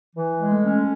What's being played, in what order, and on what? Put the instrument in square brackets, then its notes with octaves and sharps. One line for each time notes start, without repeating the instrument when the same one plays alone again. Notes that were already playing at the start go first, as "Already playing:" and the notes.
[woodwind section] E3
G#3
[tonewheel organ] A3
[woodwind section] C#4